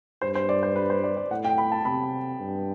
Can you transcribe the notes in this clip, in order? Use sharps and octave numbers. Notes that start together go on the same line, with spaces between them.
G2 C5
C5
D5
C5
B4
C5
D5
D5
A2 F#5
G5
B5
A5
C3 B5
G2